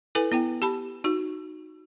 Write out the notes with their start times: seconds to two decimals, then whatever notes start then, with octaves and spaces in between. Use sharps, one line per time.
0.15 E4 A4 B4 G#5
0.32 B3 E4 G5
0.62 G4 A5 B5
1.04 D#4 F#4